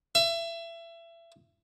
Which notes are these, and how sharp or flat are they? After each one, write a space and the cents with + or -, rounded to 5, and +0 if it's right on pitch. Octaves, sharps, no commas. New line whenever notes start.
E5 +30